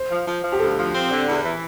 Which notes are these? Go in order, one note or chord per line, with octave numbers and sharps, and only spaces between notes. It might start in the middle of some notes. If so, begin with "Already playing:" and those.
Already playing: C5
F3
F3
F3
G4
D2 A4
F3
C4
D3
E2
E3